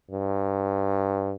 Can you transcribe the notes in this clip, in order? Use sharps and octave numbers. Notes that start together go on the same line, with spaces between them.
G2